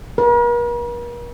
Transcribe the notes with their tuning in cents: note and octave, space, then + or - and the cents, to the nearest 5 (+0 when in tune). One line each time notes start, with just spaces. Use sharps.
A#4 +45